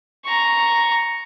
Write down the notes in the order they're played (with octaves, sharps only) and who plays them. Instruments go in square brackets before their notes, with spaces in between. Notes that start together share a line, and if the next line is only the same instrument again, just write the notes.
[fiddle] A#5 C#6